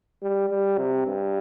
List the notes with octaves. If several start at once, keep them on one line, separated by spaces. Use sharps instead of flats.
G3
G3
C3
G2